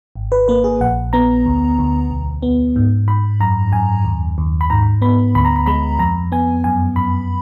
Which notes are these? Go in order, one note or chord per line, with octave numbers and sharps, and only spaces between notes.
G#1
B4
A#3 B4
G#4
A#1 F#5
B3 A#5
D2
D2
B1
B3
G#2
G#2 B5
F#2 A#5
F#2 G#5
D#2
D#2
B5
G#2 A#5
B3 B5
D2 B5
A#5
B5
G#3 B5
F2 A#5
B3 G#5
F#2 G#5
F#2 B5